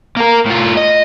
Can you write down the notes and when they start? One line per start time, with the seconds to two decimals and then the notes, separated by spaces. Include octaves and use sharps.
0.16 A#3 A#4
0.46 A2 F4
0.77 D#5